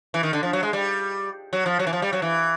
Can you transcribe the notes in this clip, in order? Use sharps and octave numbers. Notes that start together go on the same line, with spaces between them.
E3
D#3
D3
F3
F#3
G#3
G3
F#3
F3
F#3
E3
F3
G3
F#3
E3